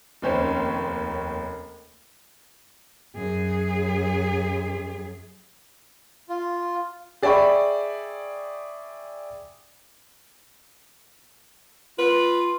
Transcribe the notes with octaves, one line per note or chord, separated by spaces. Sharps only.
F1 D#2 C#4 C5
F#2 G#4
F4
G#4 D5 E5 G5 B5 C#6
F4 B4